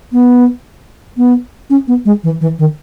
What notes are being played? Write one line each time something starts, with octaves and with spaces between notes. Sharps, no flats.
B3
B3
C#4
B3
G#3
E3
E3
D#3